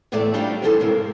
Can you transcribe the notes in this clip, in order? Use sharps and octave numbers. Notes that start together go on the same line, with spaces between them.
E2 A2 C3 A3 D5
G3 D4 D#4 F4 G4
F#2 C#3 E3 G4 A4 C5
G#2 C3 A#3